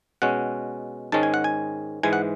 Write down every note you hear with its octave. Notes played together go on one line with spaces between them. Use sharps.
B2 G#3 C#4 F#5
G#2 D#3 G#3 C#4 A5
G#5
F#5
G#5
G#2 E3 G#3 G#5
F#5